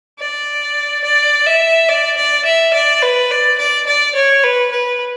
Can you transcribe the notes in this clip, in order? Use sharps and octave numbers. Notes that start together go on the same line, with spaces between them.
D5
D5
E5
D5
D5
E5
D5
B4
D5
D5
D5
C#5
B4
B4